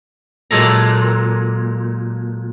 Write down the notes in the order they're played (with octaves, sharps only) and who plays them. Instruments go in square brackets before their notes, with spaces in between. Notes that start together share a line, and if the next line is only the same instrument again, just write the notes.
[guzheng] A#2 F#3 G#3 A4 A#5